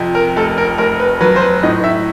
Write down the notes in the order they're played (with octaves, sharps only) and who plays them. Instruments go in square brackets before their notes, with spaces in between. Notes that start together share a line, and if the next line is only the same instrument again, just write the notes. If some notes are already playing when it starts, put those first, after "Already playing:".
Already playing: [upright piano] F2 C3
A#4
F1 A4
A#4
F1 A#4
B4
F#3 B4
C5
B4
A2 D#5
E5